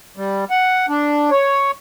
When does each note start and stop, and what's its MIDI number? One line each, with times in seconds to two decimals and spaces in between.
0.17 0.45 55
0.50 0.86 78
0.89 1.30 62
1.31 1.71 73